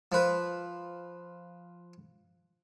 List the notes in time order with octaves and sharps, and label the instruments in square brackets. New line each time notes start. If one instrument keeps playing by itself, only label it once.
[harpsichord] F3 B4